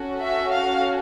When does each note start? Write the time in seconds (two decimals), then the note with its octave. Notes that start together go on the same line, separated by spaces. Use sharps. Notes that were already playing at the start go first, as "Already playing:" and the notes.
Already playing: C#4 F#4 A4
0.23 E5
0.53 F5